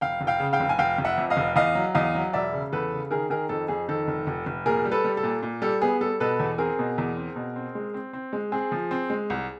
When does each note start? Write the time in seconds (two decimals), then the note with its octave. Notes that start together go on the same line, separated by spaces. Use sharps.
0.01 F1 F5 G5
0.21 F1
0.27 F5 G5
0.40 C#3
0.53 F5 G5
0.60 F1
0.69 G#5
0.79 F1 F5 G5
0.98 F1
1.05 E5 F#5
1.18 F2
1.30 D#5 F5
1.37 F1
1.56 E2 D#5 F5
1.75 F#3
1.95 E2 D#5 F5
2.15 F#3
2.33 E1 D5 E5
2.53 C#3
2.72 E2 A4 B4
2.92 C#3
3.11 D#3 G#4 A#4
3.30 D#3 G#4 A#4
3.49 F2 A4
3.68 F2 G#4
3.89 D#3 A4
4.08 F1
4.27 F1
4.46 F1
4.66 A#2 G#4 A#4
4.85 G3
4.91 A4 B4
5.04 G3
5.17 A4
5.23 A#2
5.42 A#2
5.62 G3 A4
5.82 B3 G#4
6.01 G3 A4
6.20 B2 A4 B4
6.40 E2
6.58 C4 G#4 A#4
6.79 B2
6.98 E2
7.17 C4
7.36 B2
7.56 C4
7.75 G#3
7.94 C4
8.13 C4
8.33 G#3
8.52 C4 G#4
8.72 F3
8.91 C4
9.10 G#3
9.30 C2